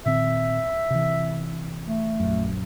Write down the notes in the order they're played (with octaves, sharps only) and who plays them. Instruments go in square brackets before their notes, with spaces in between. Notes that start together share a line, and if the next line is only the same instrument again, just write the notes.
[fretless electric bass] A#2 D#3 C4 [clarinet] E5
[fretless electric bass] C3 E3
[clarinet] A3
[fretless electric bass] A#1 F#2